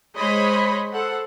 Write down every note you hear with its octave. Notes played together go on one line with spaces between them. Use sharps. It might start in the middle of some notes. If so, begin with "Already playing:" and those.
G#3 C5 C#5 D#5 B5
A4 C5 F#5